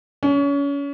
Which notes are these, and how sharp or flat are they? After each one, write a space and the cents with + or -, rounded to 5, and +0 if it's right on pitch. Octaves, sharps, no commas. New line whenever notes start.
C#4 +30